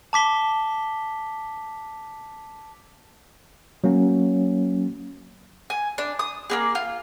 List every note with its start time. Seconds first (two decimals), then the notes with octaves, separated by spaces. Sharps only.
0.13 A5 D6 B6 G7
3.84 F#3 A#3 C#4
5.70 G#5
5.98 D4
6.19 D#6
6.50 A#3 B3 G#4
6.75 F4